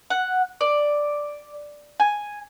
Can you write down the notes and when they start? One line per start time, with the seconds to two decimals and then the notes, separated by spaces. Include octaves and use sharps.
0.10 F#5
0.61 D5
2.00 G#5